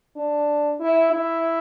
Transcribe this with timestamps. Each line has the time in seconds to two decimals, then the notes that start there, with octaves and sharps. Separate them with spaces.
0.16 D4
0.80 E4
1.13 E4